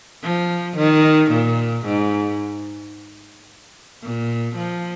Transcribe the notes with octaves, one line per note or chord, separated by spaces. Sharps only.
F3
D#3
A#2
G#2
A#2
F3